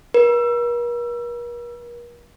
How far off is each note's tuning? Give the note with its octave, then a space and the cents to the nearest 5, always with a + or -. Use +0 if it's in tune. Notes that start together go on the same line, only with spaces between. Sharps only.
A#4 +45